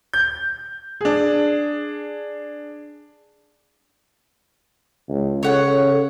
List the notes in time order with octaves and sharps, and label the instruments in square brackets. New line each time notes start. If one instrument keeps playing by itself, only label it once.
[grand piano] G6
D4 G#4
[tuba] C#2
[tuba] C#3 [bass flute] A4 [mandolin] C#5 F#5